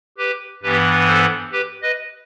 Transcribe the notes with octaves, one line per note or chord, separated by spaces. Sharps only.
G4 B4
G2 E3 B3 G4 B4
A4 C5
G4 B4
B4 D#5